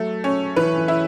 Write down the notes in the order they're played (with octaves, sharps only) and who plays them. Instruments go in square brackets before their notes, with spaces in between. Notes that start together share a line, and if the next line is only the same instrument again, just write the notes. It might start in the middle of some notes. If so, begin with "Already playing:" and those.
Already playing: [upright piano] F#3 [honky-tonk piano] A3 A4
[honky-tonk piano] C#4
[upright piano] E3 [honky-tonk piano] B4
[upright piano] E3
[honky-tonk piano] E4